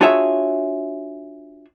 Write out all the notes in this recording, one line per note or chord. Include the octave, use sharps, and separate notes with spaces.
D4 F4 F#4 G#4 C#5 E5